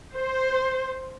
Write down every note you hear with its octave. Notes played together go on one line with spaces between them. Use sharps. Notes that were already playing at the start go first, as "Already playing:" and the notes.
C5